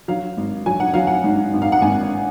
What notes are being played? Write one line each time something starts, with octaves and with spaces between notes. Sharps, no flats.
F#3 F5
G#1
F#3 G#5
F#5
F#3 F5
F#5
G#2
G#1
F5
F#5
G#1 G#5